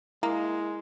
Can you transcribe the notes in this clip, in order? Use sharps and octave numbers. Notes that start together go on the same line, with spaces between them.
G#3 A#3 E4